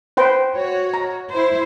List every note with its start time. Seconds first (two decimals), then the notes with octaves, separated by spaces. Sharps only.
0.17 B4 C5 G5
0.54 F#4 C#5
0.94 A#5
1.30 E4 C5